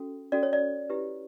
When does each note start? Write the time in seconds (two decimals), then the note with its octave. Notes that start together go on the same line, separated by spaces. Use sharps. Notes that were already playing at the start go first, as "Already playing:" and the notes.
Already playing: C#4 F#4 A4
0.32 C#4 F#4 A4 D5
0.43 C#5
0.53 D5
0.89 E4 G4 B4